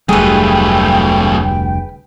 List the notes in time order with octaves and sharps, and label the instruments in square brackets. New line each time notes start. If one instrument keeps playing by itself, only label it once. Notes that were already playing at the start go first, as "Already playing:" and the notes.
[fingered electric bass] F1 D2 G3 [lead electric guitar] F#3 A3 [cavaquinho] G#4 B4 [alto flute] G5